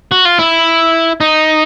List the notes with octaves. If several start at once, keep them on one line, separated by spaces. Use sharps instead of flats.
F#4
F4
E4
D#4